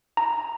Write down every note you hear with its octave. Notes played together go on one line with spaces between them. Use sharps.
A#5